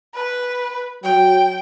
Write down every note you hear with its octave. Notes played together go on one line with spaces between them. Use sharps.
B4
F#3 G5